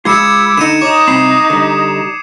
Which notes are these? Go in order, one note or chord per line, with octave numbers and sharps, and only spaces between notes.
G#3 F4 B5 D6 E6 G#6 C#7 E7
D3 D#4 C#7 D#7 E7
D#4 C#5 A#5 D6 D#6
C2 C4 B5 C7
D3 G3